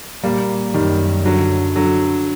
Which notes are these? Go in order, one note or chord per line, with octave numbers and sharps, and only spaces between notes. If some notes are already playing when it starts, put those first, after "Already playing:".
A#2 G3 A#3
F#2 D#3 G3
D3 F#3
D3 F#3